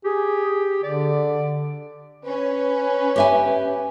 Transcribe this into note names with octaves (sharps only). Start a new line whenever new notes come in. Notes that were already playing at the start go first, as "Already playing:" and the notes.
G4 G#4
D3 D5
C#4 B4
G4 E5 G#5